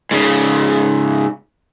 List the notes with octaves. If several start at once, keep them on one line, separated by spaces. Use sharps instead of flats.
G#2 C#3